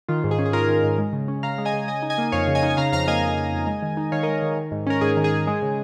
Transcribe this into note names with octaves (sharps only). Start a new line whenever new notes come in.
D#3 F4
G#2
G#4
C#4
G#4
G#2 F4 A#4
D#3
G#2
G#3
C#3
C#4
C#3 F5 A#5
G#3
D#5 G#5
C#3
C#3 D#5 G#5
D#4
D#5 G#5
A#3
F2 C#5 F5
C#3
D#5 G#5
D#4
G#5
C#3 F5 A#5
F2 F5 A#5
A#3 D#5 G#5
F2
C#3
F2
G#3
D#3
D#4
D#3 C#5 F5
G#3 A#4 D#5
D#3
D#3
G#2
C#4 A#4
G#2 G#4
D#3
G#4
G#2
G#3
C#3